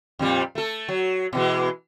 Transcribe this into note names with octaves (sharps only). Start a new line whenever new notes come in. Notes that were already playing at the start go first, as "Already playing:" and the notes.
F2 A#2 G3
A3 A4
F#3
B2 E3 G#3